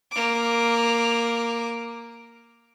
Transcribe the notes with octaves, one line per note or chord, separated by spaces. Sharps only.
A#3 D6